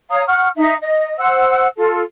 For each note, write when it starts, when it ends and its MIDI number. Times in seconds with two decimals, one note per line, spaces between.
0.10 0.22 73
0.10 0.22 77
0.10 0.22 82
0.10 0.22 87
0.27 0.48 78
0.27 0.48 85
0.27 0.48 89
0.56 0.74 63
0.56 0.74 76
0.82 1.14 75
1.18 1.67 72
1.18 1.67 78
1.18 1.67 88
1.77 2.02 65
1.77 2.02 69